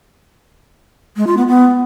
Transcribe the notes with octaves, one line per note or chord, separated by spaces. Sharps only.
G#3
F4
B3
B3